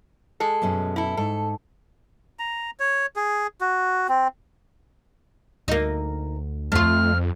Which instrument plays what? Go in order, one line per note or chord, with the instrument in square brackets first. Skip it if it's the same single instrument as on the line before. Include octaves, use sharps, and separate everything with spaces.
[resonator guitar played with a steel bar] G#3 A4
[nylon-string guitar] F#2 B2 C#4
[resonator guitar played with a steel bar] E4 A4
[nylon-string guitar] G#2 [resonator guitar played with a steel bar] A4
[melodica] A#5
C#5
G#4
F#4
C4
[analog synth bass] D2 [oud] A#3 D#4
[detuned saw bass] F2 [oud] A3 F4 [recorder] F6